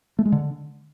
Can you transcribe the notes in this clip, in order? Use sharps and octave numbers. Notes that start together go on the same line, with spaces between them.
A3
G#3
D3